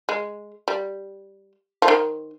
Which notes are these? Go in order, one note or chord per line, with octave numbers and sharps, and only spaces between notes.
G#3
G3
F3
D#3